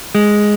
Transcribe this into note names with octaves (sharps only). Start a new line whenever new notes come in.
G#3